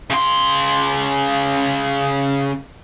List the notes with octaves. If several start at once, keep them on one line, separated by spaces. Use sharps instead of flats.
C#3 C6